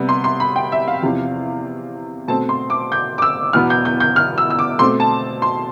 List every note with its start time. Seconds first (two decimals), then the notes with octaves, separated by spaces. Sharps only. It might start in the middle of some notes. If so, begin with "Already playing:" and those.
Already playing: C3 G3 B3
0.09 C6
0.24 C6
0.40 B5
0.56 G5
0.72 E5
0.88 F5
1.02 E2 C3 F3
2.28 B2 A3 C4 A5
2.49 C6
2.70 D6
2.92 G6
3.18 D6
3.22 E6
3.53 E2 B2 B3 F6
3.70 G6
3.85 G6
4.00 G6
4.16 F6
4.38 E6
4.50 E6
4.59 D6
4.79 B2 A3 C4 C6
5.00 A5
5.42 C6